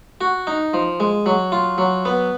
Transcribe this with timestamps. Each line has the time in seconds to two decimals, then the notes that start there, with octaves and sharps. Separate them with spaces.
0.21 F#4
0.47 D#4
0.74 F3
1.00 G#3
1.26 F#3
1.52 F4
1.78 F#3
2.05 B3